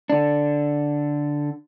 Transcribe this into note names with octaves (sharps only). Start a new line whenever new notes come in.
D3 D4